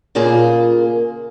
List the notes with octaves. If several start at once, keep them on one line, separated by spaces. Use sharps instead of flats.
A#2 C#3 A#3 F4 G#4